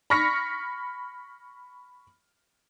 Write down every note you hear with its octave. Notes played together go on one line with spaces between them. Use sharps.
B5 C#6 F6 A#6 B6 C#7